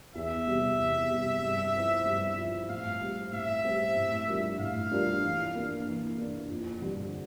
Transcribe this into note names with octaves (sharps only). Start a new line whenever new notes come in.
E2 E5
C3 G3
E2
C3 G3
G2
F3 C4 E4
G2
F3 C4 E4
A2 F5
G3 C4 G4
A2 E5
G3 C4 G4
A2
G3 D4 F4 A#4
A2 F5
G3 D4 F4 A#4
E3
A#3 D4
E3
A#3 D4
F2
D3 G3 C4